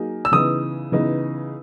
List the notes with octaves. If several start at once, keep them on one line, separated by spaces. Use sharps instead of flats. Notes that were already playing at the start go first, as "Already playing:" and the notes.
Already playing: F#3 A#3 D#4 G#4
E6
C#3 E3 B3 D#4 D#6
C#3 E3 B3 D#4